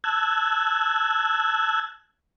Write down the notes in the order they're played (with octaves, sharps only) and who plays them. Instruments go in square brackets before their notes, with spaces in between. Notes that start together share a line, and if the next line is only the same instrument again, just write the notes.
[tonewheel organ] A5 E6 F#6 G#6